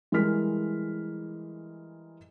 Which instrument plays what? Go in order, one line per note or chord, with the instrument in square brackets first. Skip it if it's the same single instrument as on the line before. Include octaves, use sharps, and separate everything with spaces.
[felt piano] E3 G3 G#3 A#4 F6 B6